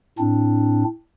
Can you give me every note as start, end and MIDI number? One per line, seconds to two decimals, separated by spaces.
0.19 0.84 45
0.19 0.84 60
0.19 0.84 62